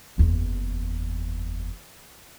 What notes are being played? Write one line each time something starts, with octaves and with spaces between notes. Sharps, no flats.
F#1 E2